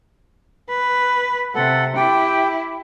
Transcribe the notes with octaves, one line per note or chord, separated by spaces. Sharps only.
B4
C3 A4 F#5
E4 G4 G5